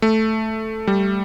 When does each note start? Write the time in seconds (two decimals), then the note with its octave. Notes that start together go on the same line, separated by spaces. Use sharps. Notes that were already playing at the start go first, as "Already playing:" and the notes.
0.02 A3
0.87 G3